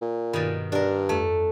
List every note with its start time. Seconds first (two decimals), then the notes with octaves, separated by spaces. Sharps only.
0.02 A#2
0.33 G2 B2 D#3 D#4 A6
0.72 G2 D4 A#4 D5
1.09 F2 A3